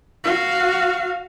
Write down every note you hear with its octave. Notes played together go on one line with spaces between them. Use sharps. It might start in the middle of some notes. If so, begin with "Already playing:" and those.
F#4 F5